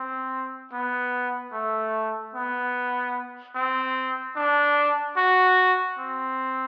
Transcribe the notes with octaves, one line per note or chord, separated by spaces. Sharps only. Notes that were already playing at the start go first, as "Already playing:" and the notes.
Already playing: C4
B3
A3
B3
C4
D4
F#4
C4